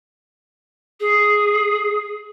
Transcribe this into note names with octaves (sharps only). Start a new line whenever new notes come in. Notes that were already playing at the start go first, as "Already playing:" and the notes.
G#4